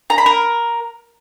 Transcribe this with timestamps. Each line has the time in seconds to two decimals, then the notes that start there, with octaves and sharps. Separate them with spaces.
0.10 A#5
0.18 B5
0.26 A#4